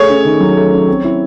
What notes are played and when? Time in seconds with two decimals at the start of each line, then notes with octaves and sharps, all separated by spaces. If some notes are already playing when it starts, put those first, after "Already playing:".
Already playing: A3 G#4 C#5
0.09 C#4
0.25 D#3
0.41 F#3
0.57 A3
0.72 C#4
0.88 C4
1.04 E4